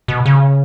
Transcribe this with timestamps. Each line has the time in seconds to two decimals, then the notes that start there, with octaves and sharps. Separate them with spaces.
0.08 B2
0.26 C#3